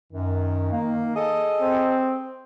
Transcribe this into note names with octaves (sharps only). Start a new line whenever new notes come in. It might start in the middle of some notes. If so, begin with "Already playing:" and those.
F#2 D#3
A#3
G#4 A4 D#5
C4